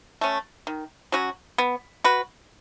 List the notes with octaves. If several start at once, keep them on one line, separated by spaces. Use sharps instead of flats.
A3 C#4
D#3
F#3 C#4 F#4
B3
F#4 B4